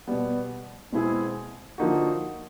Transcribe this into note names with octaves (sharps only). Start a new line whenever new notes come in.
B2 G3 B3
B2 G#3 C4 E4 G#4
D3 F3 A#3 D#4 F#4